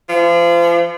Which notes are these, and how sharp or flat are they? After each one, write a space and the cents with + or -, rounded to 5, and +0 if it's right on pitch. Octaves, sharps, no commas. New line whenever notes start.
F3 -35